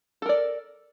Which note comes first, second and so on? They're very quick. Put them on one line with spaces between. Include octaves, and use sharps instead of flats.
A4 A#4 D5